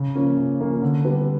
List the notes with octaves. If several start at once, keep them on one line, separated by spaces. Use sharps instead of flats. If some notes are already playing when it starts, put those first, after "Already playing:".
Already playing: C#3
F3 A#3 C#4
C#3
F3 A#3 C#4
D3
G3 B3